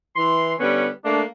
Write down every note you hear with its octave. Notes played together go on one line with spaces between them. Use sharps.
E3 C6
D3 G3 B3 C#4
A3 A#3 D4